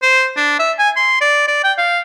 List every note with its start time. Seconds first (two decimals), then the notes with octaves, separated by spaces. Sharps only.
0.03 C5
0.37 D4
0.59 E5
0.79 G#5
0.96 C6
1.21 D5
1.48 D5
1.64 G5
1.78 F5